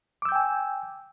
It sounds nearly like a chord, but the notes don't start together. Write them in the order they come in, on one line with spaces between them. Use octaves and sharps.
D6 E6 G6 G5 G#5